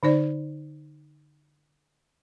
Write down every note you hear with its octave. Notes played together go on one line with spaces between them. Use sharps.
D3 D#4 C5 D5